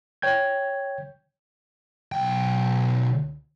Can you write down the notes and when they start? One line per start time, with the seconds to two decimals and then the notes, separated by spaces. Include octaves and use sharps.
0.22 C#5 G5 G6 G#6
2.12 B1 G5